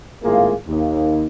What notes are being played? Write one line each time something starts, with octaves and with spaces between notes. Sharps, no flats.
G#1 A2 A#3 F4 G#4
D#2